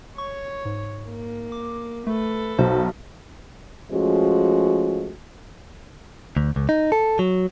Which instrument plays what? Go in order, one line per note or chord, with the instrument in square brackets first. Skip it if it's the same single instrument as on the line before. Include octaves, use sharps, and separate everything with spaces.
[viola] C#5 [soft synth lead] C#6
[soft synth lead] G#2
[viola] A#3
[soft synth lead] D6
[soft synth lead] A3 [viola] A4 B4
[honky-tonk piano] B1 [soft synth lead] C5
[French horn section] F3 G#3 A3 C#4 F#4
[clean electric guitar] D2
C#2
D#4
A4
F#3